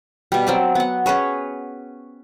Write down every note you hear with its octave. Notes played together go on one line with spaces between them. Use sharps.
B2 G3
F#3 C4 D5
B3 F#5
C#4 G#4 B4 C#5